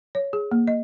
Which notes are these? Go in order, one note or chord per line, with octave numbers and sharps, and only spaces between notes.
C#5
G#4
A#3
D#5